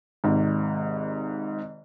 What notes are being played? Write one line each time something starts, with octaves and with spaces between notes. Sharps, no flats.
G#1 G#2 C3